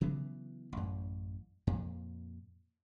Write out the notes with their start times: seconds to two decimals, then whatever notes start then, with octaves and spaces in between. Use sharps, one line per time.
0.01 C#3 E3 F#3 B3
0.73 A1 F#2
1.67 F2 A#2